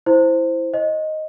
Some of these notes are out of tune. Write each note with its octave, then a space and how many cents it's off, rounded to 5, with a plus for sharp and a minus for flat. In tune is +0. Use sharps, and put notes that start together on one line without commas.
E4 +0 C5 +0
C5 +40 D#5 +0